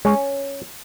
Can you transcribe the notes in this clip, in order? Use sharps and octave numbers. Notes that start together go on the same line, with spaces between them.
G#3 C#4